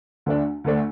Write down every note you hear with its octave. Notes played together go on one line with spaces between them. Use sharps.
D2 D3 A3 D4
D2 D3 A3 D4